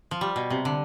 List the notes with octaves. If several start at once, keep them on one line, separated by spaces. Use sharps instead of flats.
F3
G3
B2
C3
D3